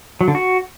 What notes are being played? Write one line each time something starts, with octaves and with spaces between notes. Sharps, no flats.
F#3
D3
F#4